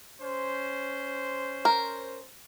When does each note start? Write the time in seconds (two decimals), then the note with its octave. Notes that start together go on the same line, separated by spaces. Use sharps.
0.21 C#4 C5
1.65 A#4